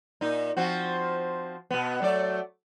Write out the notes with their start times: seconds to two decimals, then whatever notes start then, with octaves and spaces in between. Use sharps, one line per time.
0.21 A#2 D#4
0.57 F3 C4 F#4
1.70 B2 B3
2.02 F#3 A3 D5